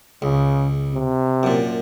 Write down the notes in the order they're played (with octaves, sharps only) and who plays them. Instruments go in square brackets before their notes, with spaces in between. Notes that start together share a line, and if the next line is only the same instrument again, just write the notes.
[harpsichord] C#2 [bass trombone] C#3
[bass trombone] C3
[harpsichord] F#2 A#2